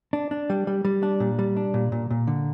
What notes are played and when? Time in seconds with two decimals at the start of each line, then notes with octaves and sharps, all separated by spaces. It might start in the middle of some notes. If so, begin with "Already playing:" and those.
0.13 D4
0.31 D4
0.50 G3
0.67 G3
0.85 G3
1.03 D4
1.20 A#2
1.39 G3
1.57 D4
1.74 A#2
1.92 A#2
2.10 A#2
2.27 D3